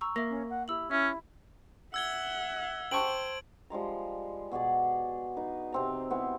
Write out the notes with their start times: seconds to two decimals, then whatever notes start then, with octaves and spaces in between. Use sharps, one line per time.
0.01 A#5 C#6 E6
0.16 A#3 E5 A#6
0.29 C#4
0.50 F#5
0.68 E4 G4 E6 F#7
0.91 C#4 E4 E5
1.94 E5 F#5 E6 G#6 G7
2.91 C5 G5 A5 C#6 D7 F#7
3.70 F3 G3 G#3 A#5
4.51 B2 F#4 G#4 D5
5.37 D#4 B4
5.72 C3 C4 A#5
6.10 B3 C4 E4